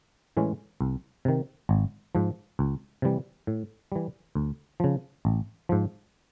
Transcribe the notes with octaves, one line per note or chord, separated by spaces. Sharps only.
A2 E3 G#3 C#4
C2
C3 D#3
G#1
G#2 F3
C#2
C3 E3 G3
A2
E3 G3
D2
C#3 F3
A1
G#2 F3